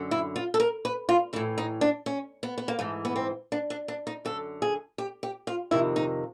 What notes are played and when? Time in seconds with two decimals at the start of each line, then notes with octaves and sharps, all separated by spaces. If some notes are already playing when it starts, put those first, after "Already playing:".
Already playing: F#2 D3
0.11 E4
0.36 F4
0.54 A4
0.60 A#4
0.85 B4
1.09 F4
1.33 E3 E4
1.36 A2
1.58 D#4
1.81 D4
2.06 C#4
2.43 B3
2.58 B3
2.68 A#3
2.79 G#2 E3 A3
3.05 B3
3.16 C4
3.52 D4
3.70 D4
3.88 D4
4.07 D#4
4.25 F#2 D3 A4
4.62 G#4
4.98 G4
5.23 G4
5.47 F4
5.71 F2 C3 D#3 E4
5.96 D#4